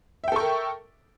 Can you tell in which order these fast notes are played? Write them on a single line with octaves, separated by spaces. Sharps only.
E5 G5 A4 C#6 A#4